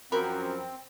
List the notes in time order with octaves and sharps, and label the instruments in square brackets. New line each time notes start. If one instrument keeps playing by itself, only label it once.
[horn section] F#2 F3 [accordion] C4 [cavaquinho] A#4 B5